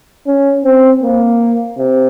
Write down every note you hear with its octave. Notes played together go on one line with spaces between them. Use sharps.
C#4
C4
A#3
C3